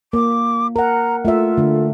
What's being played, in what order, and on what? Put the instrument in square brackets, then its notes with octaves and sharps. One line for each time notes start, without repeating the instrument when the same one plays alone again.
[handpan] A#3 [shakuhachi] D6
[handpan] A#4 F#5 [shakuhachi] A#5
[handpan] A3 E5 [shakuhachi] F4
[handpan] D3 A3